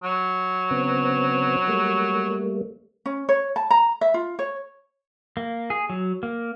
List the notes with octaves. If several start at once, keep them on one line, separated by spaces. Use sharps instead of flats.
F#3
C#3 B3 C4
G3 A3 A#3
C#4
C#5
A5
A#5
E5
F4
C#5
A#3
G#4
F#3
A#3